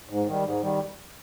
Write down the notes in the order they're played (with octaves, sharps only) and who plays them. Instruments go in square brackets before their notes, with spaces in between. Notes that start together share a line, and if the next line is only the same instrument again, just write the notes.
[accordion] G#2
D#3 G3
G#2
D#3 G3